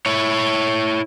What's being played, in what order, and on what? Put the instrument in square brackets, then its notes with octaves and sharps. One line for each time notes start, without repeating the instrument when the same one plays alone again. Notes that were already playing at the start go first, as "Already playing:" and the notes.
[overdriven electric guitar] E4 C#5